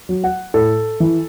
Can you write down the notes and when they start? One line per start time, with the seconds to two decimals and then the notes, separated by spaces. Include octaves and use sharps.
0.09 F#3
0.24 F#5
0.54 A2 A4
1.00 E3